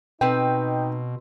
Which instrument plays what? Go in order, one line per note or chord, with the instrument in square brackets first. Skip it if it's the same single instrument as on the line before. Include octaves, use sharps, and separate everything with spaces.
[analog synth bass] B2 [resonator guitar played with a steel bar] C4 B4 [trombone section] D#4 [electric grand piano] G5